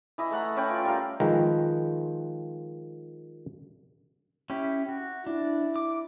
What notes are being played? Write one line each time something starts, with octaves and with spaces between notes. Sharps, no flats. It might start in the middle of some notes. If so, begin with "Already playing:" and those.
E3 E4 D#5
A3 A4 F#5 A#5
C#4 B4 G5
F4
G3 A#4 F5
D#3 F3 G#3 B4 G5 A#5
C#4 E4 G4
F#4
D4 E4
D6